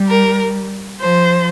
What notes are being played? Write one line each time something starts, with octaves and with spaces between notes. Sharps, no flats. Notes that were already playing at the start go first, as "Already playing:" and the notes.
Already playing: G3
A#4
F3 C5